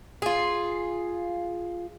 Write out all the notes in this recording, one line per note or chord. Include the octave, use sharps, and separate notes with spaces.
F4 G#4